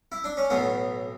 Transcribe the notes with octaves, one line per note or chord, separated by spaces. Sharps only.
E4
D4
C#4
B1 A2 E3 B3